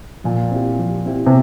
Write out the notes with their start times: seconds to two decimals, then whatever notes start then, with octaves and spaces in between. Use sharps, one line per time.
0.24 A#2 F3
0.51 C4 E4 G4
0.79 F3
1.06 C4 E4 G4
1.26 C3